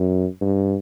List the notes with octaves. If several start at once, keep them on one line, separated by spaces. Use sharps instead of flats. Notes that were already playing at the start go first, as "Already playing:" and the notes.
Already playing: F#2
G2